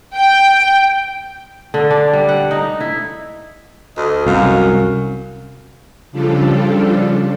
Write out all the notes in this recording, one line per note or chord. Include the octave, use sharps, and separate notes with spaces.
G5
D3
D4
G3
F#5
D#4
E4
D2 D#5
C2 F#2 F5
C#3 F3 G3 D4 F4 A4